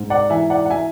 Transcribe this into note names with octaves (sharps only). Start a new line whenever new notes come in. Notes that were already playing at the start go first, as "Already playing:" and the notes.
Already playing: G#2
D5 F#5
E3 E5 G#5
D5 F#5
F#5
E5 G#5